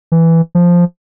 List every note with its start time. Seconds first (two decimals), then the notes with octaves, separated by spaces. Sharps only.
0.12 E3
0.55 F3